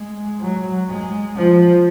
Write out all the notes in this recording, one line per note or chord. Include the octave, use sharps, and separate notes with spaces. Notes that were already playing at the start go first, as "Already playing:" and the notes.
Already playing: G#3
F#3
G#3
F3